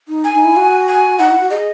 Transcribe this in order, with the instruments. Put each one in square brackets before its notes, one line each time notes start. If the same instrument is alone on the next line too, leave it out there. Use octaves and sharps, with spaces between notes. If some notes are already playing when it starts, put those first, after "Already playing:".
[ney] D#4
[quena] G#5
[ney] D#4
E4
F#4
[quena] G#5
[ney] D#4 [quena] F#5
[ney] E4
F#4
[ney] G#4 [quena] D#5